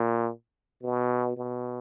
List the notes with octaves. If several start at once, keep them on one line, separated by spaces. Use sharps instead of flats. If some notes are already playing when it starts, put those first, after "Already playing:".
Already playing: A#2
B2
B2